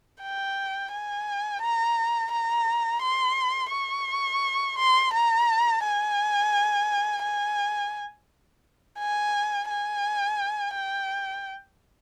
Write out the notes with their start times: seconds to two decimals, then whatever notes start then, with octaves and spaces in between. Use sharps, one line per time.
0.22 G5
0.92 G#5
1.62 A#5
2.32 A#5
3.02 C6
3.72 C#6
4.78 C6
5.13 A#5
5.83 G#5
7.23 G#5
8.99 G#5
9.69 G#5
10.74 G5